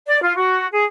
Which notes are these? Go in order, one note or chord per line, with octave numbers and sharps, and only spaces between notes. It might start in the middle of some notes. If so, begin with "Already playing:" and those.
D5
F4
F#4
G#4